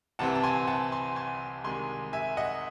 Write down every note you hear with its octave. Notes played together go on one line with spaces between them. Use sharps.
C2 C3 E3 C4 F#5 A5
A5
G#5 C6
F#5 A5
G#5 C6
G#5 C6
C2 C3 D#3 G#3 G#5 C6
E5 G#5
D#5 F#5